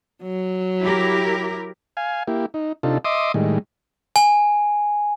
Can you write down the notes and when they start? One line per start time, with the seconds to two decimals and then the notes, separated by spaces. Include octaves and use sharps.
0.23 F#3
0.82 E4 G4 A#4
1.97 F5 G#5
2.27 A#3 E4 G4
2.54 D#4
2.83 C3 D4 D#4 F4 A4
3.05 D#5 E5 C6 D6 D#6
3.34 A2 D#3 G3 G#3
4.16 G#5